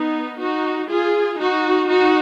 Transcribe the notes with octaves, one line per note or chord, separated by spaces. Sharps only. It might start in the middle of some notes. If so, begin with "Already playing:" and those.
Already playing: B3 D#4
D#4 F#4
F4 G#4
D#4 F#4
D#4 F#4